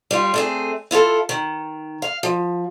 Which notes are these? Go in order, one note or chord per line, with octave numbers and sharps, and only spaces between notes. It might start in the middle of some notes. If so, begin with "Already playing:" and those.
G3 F4
A3 C4 G#4
E4 F4 G4 A4
D#3
F5
F3